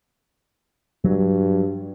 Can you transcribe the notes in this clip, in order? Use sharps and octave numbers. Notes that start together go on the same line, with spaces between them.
G2 F#3